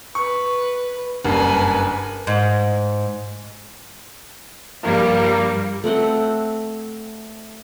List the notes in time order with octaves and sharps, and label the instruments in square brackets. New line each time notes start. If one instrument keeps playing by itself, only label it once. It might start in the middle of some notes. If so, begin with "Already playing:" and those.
[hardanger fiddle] B4 [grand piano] C#6
[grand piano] F#1 G2 [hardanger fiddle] B4 G#5
[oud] G#2
[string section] G2 F3 G3 [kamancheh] A#3
[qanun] A3 C4 F#5 G5